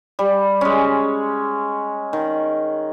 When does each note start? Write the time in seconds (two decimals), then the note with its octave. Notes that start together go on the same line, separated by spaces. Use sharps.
0.19 G3
0.61 G#3 C#4
2.13 D#3